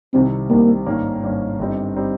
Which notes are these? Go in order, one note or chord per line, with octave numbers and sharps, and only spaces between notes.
C2 C3 D#3 G3 C4
C2 C3 D#3 G3 A#3
G#1 G2 D#3 A#3 C#4
G#1 G2 D#3 A#3 C#4
G1 G2 G3 C4 D#4
G3 C4 D#4